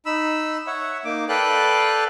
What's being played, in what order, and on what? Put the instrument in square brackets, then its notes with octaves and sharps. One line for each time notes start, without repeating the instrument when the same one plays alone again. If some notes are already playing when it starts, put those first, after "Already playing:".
[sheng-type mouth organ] D#4 B5 E6
C#5 E5 F#5
A#3 D#4 D6
A4 B4 D5 F5 G5 F#6